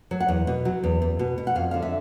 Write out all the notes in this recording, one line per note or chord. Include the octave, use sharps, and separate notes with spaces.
F#3
F#5
E2
B2
F#3
E2
E2
B2
B2
F#5
F2 F5
D3 F5
E5